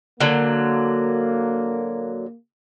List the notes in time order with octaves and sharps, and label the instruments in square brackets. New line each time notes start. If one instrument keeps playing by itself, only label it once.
[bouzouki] D3 F#3 [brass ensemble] A#3